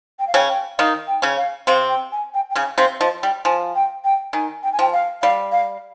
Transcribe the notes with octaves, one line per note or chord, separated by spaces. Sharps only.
G5
F5
C#3 C#4 G5
G5
D#3 D#4 F5
G5
C#3 C#4
F5
C3 C4 F5
G5
G#5
G5
G5
C#3 C#4 G#5
C3 C4 F5
F3 D#5
G3 G5
F3 G#5
G5
G5
D#3 G#5
G5
G#5
F3 G5
F5
G3 F5
F5